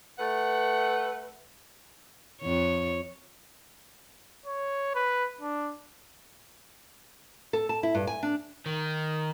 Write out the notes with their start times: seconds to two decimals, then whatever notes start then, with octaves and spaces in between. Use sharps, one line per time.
0.19 A3 B4 F#5
2.41 F2 C#5
4.46 C#5
4.95 B4
5.41 D4
7.53 A4
7.69 A5
7.83 E4
7.95 G2
8.07 G#5
8.23 D4
8.66 D#3